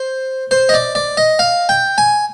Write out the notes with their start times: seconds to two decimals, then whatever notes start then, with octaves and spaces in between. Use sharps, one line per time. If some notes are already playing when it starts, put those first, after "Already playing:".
Already playing: C5
0.51 C5
0.69 D#5
0.74 D5
0.95 D5
1.17 D#5
1.39 F5
1.69 G5
1.98 G#5